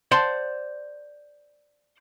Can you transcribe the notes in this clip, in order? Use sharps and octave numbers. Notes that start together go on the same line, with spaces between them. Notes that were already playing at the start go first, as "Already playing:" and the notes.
C5 D5 F#5 A5 C6